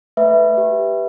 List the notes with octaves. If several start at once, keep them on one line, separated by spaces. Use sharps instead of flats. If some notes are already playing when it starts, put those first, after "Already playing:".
A3 B4 E5
G4